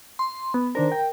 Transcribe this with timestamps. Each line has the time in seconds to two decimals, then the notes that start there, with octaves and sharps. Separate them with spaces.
0.19 C6
0.54 B3
0.75 D#3 D4 A#4 C5
0.92 G5